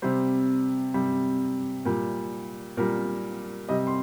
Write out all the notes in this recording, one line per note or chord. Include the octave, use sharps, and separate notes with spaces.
C3 G3 C5
C3 G3
A#2 G3
A#2 G3 A#4
C3 G3 D#5
C6